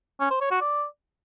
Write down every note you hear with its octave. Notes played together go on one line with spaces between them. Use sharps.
C#4
C5
C#5
F#4
D5